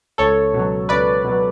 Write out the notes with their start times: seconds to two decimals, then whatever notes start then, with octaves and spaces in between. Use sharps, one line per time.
0.18 C#2 A4 C#5
0.54 B2
0.59 F#3
0.89 C#2 B4 D5
1.25 B2
1.30 F#3